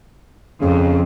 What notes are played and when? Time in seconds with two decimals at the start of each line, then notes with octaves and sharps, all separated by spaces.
0.61 F2 C#3